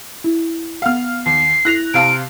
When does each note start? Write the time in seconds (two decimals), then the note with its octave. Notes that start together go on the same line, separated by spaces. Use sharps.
0.24 E4
0.82 B3 F5 F#5 F6
1.26 D#2 C7
1.65 E4 F#6 A#6 F7
1.94 C3 F5 A5 D7